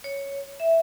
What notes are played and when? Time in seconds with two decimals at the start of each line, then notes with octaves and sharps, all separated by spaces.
0.04 C#5
0.60 E5